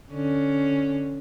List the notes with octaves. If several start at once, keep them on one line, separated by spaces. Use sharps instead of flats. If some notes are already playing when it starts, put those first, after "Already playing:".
D3 C#4